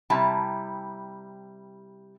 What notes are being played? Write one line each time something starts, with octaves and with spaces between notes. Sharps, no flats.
C3 G3 E4 A5 A#5